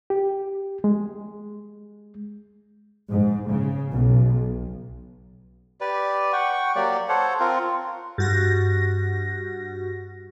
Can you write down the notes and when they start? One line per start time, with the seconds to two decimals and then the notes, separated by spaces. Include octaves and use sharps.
0.10 G4
0.84 G#3
3.10 G#2
3.50 C#3
3.91 B1
5.81 G4 B4 D5
6.33 F#5 G5 C#6
6.76 F#3 A#3 G4 D5
7.09 A4 C5 C#5 F#5
7.40 C4 F4 A#4
8.18 G2 F#4 A#6